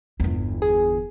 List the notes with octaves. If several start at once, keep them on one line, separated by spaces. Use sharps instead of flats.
G1 E2
G#4